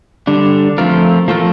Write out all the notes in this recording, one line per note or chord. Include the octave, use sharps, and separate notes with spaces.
D3 G3 D4
F3 A3 C4 F4 A#4
F3 A3 C4 F4 A#4